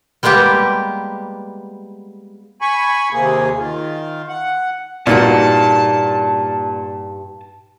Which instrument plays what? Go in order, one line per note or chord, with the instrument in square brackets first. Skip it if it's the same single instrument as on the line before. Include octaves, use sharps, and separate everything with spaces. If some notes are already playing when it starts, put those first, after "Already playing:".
[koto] G3 G#3 A#3 B3 G4
[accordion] G#5 B5 C#6
D#2 C3 A#3 G#4
D#3 F4
F#5
[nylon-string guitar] G2 D#4 F#4 [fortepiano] A#2 [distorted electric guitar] A5